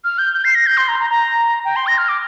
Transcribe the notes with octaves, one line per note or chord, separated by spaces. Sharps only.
F6
G6
G6
C7
A#6
G6
C6
A#5
A#5
A#5
G5
C6
A#6
F6
D6